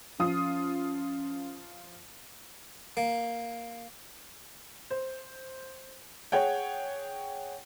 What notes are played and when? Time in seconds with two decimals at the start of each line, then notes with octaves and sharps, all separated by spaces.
0.19 F3 C#4 F4 D#6
2.97 A#3
4.91 C5
6.32 G#4 C#5 F#5 G5